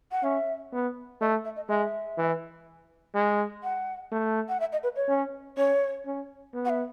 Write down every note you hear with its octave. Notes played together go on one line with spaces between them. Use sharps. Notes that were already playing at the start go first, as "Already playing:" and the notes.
F#5
C#4 E5
B3
A3 D#5
E5
D#5
G#3 E5
E3
G#3
F#5
A3
F#5
E5
D#5
B4
C#5
C#4
C#4 C#5
C#4
B3
F#5
E5